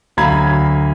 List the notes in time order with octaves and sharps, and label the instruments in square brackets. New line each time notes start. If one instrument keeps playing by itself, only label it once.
[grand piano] D2 F#3 F5 A#5 B5 G#6